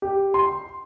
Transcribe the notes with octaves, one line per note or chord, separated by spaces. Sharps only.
G4
C6